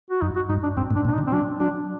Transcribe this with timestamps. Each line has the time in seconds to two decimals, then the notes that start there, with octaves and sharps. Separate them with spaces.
0.10 F#4
0.22 F#2 D#4
0.36 F#4
0.49 G2 D#4
0.63 D4
0.77 G2 C4
0.91 A2
0.95 D4
1.05 A#2
1.08 D4
1.14 D#4
1.18 D3
1.27 C4
1.32 F#3 D4
1.60 F#3 D4